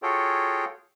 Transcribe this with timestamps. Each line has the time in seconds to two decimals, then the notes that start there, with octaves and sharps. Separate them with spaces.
0.03 F4 F#4 G#4 A4 C#5 G5